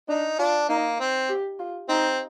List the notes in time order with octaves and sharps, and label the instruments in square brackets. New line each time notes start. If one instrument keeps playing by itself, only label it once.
[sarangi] D4 [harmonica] D#4
[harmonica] D4 [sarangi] F4
[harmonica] A#3 [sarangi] D#4
[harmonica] C4
[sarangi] G4
F4
[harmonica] C4 [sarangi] D#4